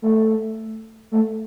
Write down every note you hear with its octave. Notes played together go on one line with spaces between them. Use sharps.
A3
A3